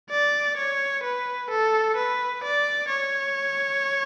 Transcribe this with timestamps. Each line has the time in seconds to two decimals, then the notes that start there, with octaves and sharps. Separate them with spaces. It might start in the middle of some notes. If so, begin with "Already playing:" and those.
0.10 D5
0.57 C#5
1.03 B4
1.50 A4
1.96 B4
2.43 D5
2.89 C#5